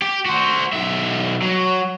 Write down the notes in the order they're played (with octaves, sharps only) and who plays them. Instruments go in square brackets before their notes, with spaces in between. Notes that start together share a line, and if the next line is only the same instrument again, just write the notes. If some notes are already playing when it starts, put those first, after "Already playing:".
[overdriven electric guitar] G4
F#4 C5
B1 E5
F#3